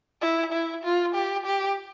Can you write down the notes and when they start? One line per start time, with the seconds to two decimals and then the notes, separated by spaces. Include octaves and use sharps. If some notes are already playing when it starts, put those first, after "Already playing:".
0.22 E4
0.52 E4
0.84 F4
1.15 G4
1.46 G4